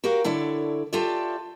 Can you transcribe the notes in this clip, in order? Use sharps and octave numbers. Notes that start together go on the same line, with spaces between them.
F#4 G4 A#4 F5
D3 E4 A4 C#5 D5
F4 G4 A4 C#5 D5 E5